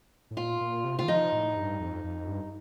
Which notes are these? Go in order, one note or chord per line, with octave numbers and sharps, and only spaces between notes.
A2
A#2 F4
A#2
C3
F4
D#3
F3 D#4
A2
G2
F2
F2
G2